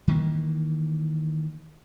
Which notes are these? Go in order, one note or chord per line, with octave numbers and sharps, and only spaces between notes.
D#3 E3 A3 A#3